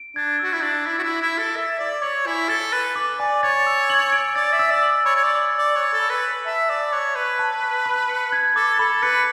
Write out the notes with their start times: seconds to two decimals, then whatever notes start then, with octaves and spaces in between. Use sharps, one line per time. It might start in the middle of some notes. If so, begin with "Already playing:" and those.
Already playing: D7
0.16 D4 G#6
0.39 F#4 E6
0.53 E4
0.63 D4 F#7
0.86 E4 D6
0.99 F#4
1.03 E4
1.10 F#7
1.22 E4
1.32 D7
1.39 A4
1.56 E5 A6
1.79 D5 D6
2.02 C#5 F#7
2.26 E4 G#5
2.49 A4 A6
2.73 B4 F#6
2.96 D6
3.20 D5 G#5
3.43 C#5 A6
3.67 E6
3.90 F#7
4.12 D7
4.36 D5 A6
4.53 E5
4.59 E6
4.71 D5
4.83 F#7
5.05 C#5 B5
5.16 C#5
5.24 D5
5.29 F#7
5.52 C#7
5.59 D5
5.76 C#5 F#6
5.93 A4
6.00 B5
6.10 B4
6.23 F#7
6.46 E5 A5
6.69 D5 B6
6.93 C#5 F#6
7.15 B4 C#6
7.39 A5
7.63 B6
7.86 B5
8.09 C#7
8.32 G#6
8.56 A4 D6
8.79 A4 B5
9.03 B4 C#7